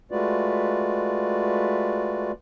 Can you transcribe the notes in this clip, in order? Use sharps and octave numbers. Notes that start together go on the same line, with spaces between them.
G#3 A3 F4 F#4 B4 D5